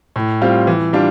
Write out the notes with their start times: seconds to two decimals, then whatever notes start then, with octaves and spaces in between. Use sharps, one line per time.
0.16 A2
0.41 G3 C4 F4
0.67 E3
0.93 G3 D4 F4